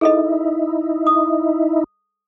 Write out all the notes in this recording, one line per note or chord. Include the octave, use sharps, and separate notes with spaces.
D#4 E4 G#4 A4 D#5
D#6